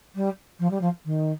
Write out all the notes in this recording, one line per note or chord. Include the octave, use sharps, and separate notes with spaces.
G3
F3
G3
F3
D#3